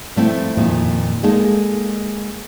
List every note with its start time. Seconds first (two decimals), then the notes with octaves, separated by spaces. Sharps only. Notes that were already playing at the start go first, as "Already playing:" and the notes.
0.16 F3 A3 C4 E4 E5
0.57 F2 A#2 D#3 F3
1.23 G#3 A#3 D#4 A4